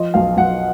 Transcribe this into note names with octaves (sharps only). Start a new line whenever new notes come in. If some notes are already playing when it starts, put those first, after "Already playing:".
Already playing: F3 D#5
B1 F5
B1 F#5